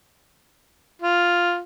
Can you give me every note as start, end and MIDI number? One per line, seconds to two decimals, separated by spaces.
1.02 1.60 65